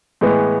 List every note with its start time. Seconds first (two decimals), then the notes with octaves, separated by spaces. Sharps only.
0.21 A2 E3 G#3 B3